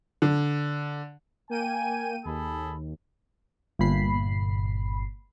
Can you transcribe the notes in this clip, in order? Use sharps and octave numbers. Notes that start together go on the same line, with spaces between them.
D3
A#3 G5 G#5 D#7
D#2 G#4 A4 B5
G1 A#2 B5 C7